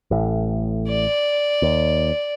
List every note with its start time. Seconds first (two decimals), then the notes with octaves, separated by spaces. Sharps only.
0.11 A1 A2
0.89 D5
1.62 D#2